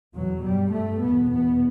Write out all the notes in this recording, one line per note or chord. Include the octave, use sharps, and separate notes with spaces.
E2 B2 F#3
G2 G3
G2 A3
E2 B2 B3
E2 B2 B3